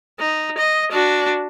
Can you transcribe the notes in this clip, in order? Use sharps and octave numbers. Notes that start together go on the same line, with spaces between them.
D#4
D#5
D4 F#4